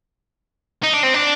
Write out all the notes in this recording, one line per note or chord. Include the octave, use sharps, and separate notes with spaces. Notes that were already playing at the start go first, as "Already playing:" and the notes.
D#4
D4
C4
D4